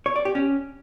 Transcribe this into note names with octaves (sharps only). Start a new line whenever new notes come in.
C#5
D5
G4
C#4